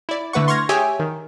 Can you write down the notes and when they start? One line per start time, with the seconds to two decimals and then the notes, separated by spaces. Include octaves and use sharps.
0.09 E4 D5
0.33 D3 A3 B4 F#5 C#6
0.48 C6 C#6 F6 G#6 A#6
0.69 G4 G#4 C#5 E5 G5 G#5
0.99 D#3